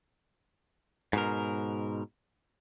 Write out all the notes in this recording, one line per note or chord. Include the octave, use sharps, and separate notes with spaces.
G#2 B2 A#4